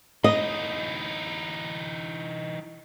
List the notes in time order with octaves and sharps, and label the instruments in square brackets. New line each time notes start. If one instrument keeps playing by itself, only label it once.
[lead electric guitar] E3 D#4 [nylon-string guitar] D#5